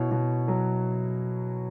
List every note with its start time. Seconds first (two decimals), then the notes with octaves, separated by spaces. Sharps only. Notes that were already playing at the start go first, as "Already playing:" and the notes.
Already playing: B2 E4 C#5
0.11 B2
0.48 F#3